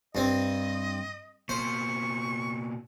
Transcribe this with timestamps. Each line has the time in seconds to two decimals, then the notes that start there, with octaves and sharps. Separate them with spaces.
0.15 G2 C4 D#5
1.49 B2 A#3 C5 C#6